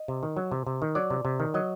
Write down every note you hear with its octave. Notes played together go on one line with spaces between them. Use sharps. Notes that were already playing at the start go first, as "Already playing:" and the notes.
Already playing: D#5
C3
D#3
F#3
C3
C3
D#3
F#3 D5
C3
C3
D#3
F#3 D#5